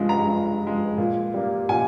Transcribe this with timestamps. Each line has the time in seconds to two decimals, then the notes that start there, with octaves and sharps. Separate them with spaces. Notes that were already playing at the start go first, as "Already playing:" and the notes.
Already playing: G2 F3 G#3
0.09 A#5
0.26 G2
0.62 F3 G#3
0.98 A#2
1.34 G3 A#3
1.69 A#2 G#5